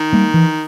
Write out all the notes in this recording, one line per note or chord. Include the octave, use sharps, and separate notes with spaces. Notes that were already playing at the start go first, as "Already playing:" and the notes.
Already playing: D#3
G3 A#3
E3